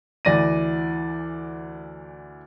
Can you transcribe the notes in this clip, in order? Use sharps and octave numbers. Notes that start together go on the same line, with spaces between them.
D2 E3 D5 A#6 D#7